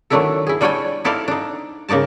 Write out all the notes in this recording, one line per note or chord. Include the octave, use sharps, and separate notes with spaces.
D#3 F#3 A3 D4 E4 A4
E4 G#4
G3 D4 C#5 D5 G5 G#5
D#4 E4 A4 C5 D5 F5
D4 D#4
C#3 A#3 D#4 D5 A5